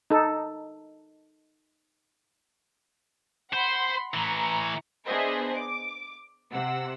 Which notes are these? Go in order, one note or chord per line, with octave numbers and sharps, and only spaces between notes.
D#4 A4
C5 F#5 B5 C6
A2 E3 A#5 C#7
B3 D4 G#4 C5 D#5 E5
D6
C3 F#5 E6